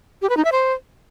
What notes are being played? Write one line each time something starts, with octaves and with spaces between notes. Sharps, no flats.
G4
B4
D#4
E5
C5